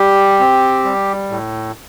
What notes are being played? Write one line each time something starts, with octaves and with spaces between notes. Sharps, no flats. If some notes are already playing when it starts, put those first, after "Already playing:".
Already playing: G3 G4
C4
G3
A2